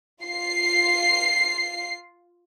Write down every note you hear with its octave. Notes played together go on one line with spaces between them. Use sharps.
F4 C7